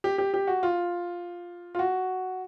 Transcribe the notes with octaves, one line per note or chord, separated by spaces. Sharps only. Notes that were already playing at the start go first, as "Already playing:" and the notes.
G4
G4
G4
F#4
F4
F4
F#4